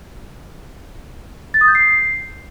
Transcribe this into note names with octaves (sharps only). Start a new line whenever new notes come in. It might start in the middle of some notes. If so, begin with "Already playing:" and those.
A6
D#6
G6
C7